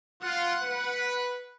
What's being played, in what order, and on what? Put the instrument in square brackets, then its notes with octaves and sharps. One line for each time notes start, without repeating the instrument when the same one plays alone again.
[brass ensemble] F4 [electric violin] F#5
[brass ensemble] B4